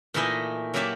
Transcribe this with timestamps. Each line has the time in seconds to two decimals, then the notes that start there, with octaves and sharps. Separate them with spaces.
0.14 A#2 E3 A3 D#4 E4 D#5
0.74 F#3 A#3 E4 G4 D5 E5